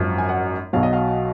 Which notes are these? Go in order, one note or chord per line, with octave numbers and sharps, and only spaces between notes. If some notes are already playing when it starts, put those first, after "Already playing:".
Already playing: G#1 F#2 F3
G#5
F#5
B1 B2 F#3 F5
D#5
F5